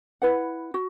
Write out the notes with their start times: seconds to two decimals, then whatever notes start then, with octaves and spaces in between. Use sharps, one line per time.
0.22 E4 B4 F#5
0.74 F#4